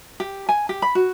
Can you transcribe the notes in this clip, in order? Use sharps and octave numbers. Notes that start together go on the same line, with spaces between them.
G4
G#5
G4
B5
F#4